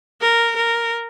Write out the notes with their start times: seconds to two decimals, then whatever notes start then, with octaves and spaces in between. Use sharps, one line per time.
0.21 A#4
0.56 A#4